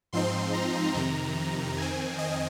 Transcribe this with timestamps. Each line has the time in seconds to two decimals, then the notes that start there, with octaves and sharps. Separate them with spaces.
0.13 G#2 F3 C4 D#4 C6
0.54 A#5
0.95 F2 C3 D#3
1.77 F2 D#3 C4 G#5
2.18 D#5